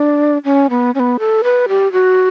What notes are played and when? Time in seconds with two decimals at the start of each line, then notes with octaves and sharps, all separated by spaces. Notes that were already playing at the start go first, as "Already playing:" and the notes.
Already playing: D4
0.45 C#4
0.70 B3
0.95 C#4
1.00 B3
1.19 A4
1.44 B4
1.69 G4
1.92 F#4